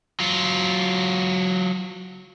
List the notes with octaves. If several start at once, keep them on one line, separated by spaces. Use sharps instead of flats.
F#3 F4